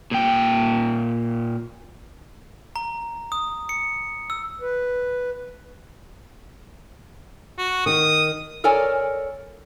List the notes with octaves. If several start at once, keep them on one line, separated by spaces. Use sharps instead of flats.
A#2 G5
A#5
D#6
C#7
E6
B4
F#4
D#3 D#6
A4 A#4 C#5 D5 G#5